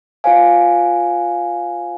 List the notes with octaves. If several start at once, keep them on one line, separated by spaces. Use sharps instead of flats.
F4 C5 F5 G#5